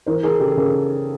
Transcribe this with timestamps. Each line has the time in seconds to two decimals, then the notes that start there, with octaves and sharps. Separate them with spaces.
0.06 E3 A#4 C5
0.23 E3 G#4 A#4
0.40 C#3 G4 A4
0.57 C#3 G#4 A#4